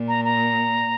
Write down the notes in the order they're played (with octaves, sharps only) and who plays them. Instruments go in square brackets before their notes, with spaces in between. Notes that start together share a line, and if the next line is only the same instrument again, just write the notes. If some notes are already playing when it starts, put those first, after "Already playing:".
Already playing: [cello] A#2
[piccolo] A#5
A#5